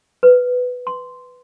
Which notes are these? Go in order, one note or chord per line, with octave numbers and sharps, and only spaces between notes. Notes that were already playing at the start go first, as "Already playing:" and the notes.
B4
C6